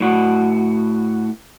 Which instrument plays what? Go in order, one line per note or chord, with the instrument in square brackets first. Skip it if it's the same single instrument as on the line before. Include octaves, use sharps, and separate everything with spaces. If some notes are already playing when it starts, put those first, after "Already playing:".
[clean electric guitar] A2 F#4